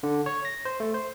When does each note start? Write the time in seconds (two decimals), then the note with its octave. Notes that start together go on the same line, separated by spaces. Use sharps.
0.03 D3
0.26 C#5
0.45 A#6
0.65 C5
0.80 A3
0.94 C5